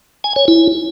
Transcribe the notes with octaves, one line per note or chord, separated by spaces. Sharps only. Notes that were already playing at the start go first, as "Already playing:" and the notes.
G#5
C#5
E4